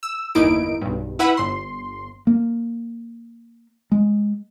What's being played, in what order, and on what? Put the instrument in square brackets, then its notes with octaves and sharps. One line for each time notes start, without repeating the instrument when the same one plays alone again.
[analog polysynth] E6
G1 E2 A#3 D#4 E4 D7
B1 G2
E4 B4 E5 F#5 B5
G1 C6
[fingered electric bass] A#3
G#3